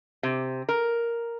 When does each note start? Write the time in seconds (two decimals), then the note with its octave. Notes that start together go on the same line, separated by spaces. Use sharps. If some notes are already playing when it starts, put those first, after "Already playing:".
0.23 C3
0.69 A#4